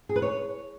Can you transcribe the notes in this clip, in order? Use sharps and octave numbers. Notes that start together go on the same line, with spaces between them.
G#4
B4
C#5